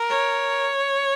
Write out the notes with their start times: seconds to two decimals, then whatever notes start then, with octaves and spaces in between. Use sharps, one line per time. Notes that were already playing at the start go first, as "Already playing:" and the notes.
Already playing: A#4
0.10 C#5